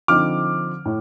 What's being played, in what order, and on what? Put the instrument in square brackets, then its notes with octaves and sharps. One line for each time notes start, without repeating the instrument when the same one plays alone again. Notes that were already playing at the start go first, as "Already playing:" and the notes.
[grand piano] D3 F3 C4 D#4 D6 F6
A2